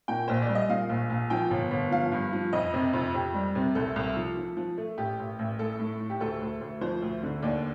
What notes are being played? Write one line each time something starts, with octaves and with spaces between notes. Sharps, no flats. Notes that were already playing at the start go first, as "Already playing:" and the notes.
A#2 G5
A#1 C5
D5
G3
D#5
A#2 F5
A#1
A#1
F3 G5
G1
G1
F3 F5
G2
F3
F2 D#5
C3
F2
F2 G4
G3
C3
C2 A4
C2
F3
F3
F3
A3
A1 G4
A1
A1
A2 A4
A2
A2
G4
D2 A4
D2
D2
F3 C5
D2
D3
D#2 D5